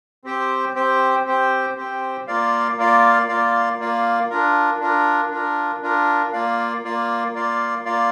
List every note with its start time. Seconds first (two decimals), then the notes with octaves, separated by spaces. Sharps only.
0.24 C4 G4 C5 G5
0.74 C4 G4 C5 G5
1.25 C4 G4 C5 G5
1.77 C4 G4 C5 G5
2.27 A#3 F4 D5 F5
2.78 A#3 F4 D5 F5
3.28 A#3 F4 D5 F5
3.79 A#3 F4 D5 F5
4.30 D4 F4 A#4
4.80 D4 F4 A#4
5.31 D4 F4 A#4
5.82 D4 F4 A#4
6.33 A#3 F4 D5 F5
6.84 A#3 F4 D5 F5
7.34 A#3 F4 D5 F5
7.85 A#3 F4 D5 F5